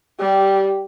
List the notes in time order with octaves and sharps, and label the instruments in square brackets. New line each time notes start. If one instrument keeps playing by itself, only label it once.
[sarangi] G3 [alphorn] G4